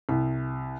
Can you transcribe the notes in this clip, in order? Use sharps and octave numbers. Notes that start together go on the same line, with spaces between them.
C2